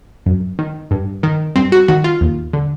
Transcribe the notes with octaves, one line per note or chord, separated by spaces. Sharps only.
F#2
D#3
G2
D#3
G2 C4
F#4
D#3 F#4
F4
D#2
D3